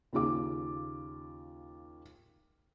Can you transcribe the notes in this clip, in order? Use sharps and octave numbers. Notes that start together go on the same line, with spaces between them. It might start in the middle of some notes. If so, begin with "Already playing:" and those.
D#2 C#3 F4 D6